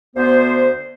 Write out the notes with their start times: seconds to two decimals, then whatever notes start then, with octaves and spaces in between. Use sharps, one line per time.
0.16 D2 B3 C5